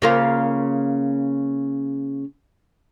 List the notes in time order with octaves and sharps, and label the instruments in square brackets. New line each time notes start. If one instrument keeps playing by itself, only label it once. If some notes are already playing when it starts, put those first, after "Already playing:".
[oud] C#3 A#3 F4